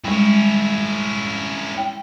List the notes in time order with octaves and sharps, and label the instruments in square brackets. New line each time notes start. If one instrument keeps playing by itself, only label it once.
[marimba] G3 G#3 [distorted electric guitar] C#4 E4
[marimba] G5